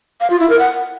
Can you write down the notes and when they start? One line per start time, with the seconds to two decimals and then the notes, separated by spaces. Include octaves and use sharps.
0.21 F5
0.30 F4
0.40 E4
0.50 A#4
0.59 F#5